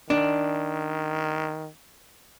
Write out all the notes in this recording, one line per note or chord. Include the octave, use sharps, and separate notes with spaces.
D#3 D4